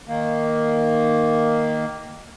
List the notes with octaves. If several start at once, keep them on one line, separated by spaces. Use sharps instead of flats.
D#3 A#3